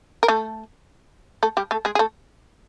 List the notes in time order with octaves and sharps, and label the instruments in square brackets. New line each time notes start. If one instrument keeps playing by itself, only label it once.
[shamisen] A#4
A3 A4
A3 A4
G3 G4
A3 A4
G#3 G#4
G#4
A3 A4